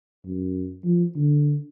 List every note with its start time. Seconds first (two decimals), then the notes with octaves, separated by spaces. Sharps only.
0.25 F#2
0.84 F3
1.16 D3